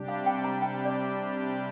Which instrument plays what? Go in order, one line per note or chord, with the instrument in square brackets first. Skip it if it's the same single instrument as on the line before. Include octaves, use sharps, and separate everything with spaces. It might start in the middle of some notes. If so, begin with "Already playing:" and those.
Already playing: [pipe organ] C3 G3 D4 G4
[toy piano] F5
G5
A#5
G5
D5